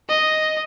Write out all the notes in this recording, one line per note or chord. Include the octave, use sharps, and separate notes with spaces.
D#5